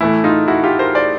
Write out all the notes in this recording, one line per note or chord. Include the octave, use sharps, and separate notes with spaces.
A2 E3 A3 E4
D#4 F4
E4 F#4
F4 G4
A#4 C5
C5 D5